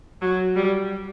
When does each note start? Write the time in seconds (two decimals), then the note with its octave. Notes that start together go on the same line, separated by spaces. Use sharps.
0.22 F#3
0.56 G3